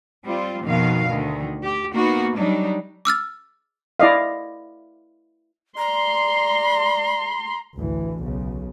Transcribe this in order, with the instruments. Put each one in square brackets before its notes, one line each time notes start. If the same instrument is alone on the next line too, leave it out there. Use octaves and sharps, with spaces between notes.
[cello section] G3 C4 F4
F2 B2 D#3 F5
D2 D#3
G4
A#3 B3 D#4 F#4
F#3 G3 D4 D#4
[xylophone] D6 E6 F6 A6
[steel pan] E4 D5 D#5 F5
[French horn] D5 [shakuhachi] A#5 [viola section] C6
[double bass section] A1 D2 E3
B1 C#3